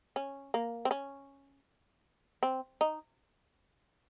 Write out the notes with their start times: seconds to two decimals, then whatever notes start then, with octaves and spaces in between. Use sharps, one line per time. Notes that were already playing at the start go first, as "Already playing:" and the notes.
0.16 C#4
0.54 A#3
0.85 C4
0.91 C#4
2.43 C4
2.81 D#4